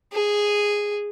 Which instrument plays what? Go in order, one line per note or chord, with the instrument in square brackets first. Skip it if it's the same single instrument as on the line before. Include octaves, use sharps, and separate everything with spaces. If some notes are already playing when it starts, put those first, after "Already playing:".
[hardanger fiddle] G#4